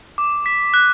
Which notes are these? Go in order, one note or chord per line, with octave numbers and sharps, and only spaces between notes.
D6
B6
F#6